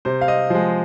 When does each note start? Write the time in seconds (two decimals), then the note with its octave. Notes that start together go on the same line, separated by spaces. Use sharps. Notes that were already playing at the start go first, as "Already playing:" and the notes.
0.05 C3 C5
0.21 F5
0.28 D#5
0.50 F3 G#3 C5